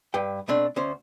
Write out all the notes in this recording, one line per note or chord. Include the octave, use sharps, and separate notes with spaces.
G2 B4 G5
B2 A3 C4 D4
D2 C#4 C5